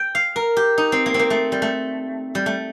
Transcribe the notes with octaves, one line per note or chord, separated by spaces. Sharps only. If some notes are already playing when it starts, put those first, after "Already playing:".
Already playing: G5
F5
A#4
G4
D#4
C4
A#3
C4
A#3
A3
G3
A3
G3
A3